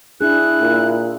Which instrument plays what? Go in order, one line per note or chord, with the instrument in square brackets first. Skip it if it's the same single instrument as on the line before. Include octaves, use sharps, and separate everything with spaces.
[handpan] D4 G#4 [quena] E4 [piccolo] F#6
[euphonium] A#2